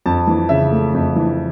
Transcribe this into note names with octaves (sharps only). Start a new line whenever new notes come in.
F2 A5
E3
C#3 E5
A3
F2
E3